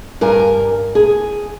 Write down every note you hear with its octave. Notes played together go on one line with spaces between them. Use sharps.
G2 A#4 G#5
G#4